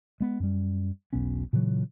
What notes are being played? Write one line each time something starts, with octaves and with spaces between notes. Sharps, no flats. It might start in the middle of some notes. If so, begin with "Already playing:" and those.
G#3 B3
F#2 G3
E1 B1 B3 C#4
A#2 C#3 E3 F#3